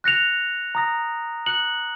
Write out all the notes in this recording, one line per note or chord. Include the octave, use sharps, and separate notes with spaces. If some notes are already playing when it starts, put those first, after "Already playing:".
F#6 A#6 C#7 F7
A#5 D#6 A#6
D#6 F#6 C#7 F#7